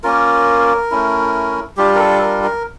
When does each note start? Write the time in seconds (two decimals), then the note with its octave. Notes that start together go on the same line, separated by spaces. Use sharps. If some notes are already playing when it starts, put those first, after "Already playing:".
0.03 A#3 C#4 F4 A#4
0.91 A3 C#4 E4
1.77 G3 D4 F4 G4
1.95 A#4
1.99 A4
2.22 A#4
2.43 A#4